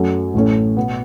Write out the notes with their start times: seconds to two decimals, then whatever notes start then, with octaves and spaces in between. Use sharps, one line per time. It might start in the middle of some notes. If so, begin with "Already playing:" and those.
Already playing: F#2 F#3 A3 C#4
0.34 A1 A2 A3 C#4
0.77 B2 B3